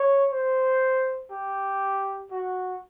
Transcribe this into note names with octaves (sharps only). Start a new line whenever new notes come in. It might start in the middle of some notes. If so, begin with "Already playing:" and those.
Already playing: C#5
C5
G4
F#4